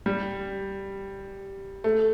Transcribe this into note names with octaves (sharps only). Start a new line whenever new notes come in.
G3
A3